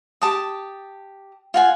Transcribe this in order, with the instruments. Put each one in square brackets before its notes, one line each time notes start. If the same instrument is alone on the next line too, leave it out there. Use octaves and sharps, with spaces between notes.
[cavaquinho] G4 A5 D#6
F4 F#5 G#5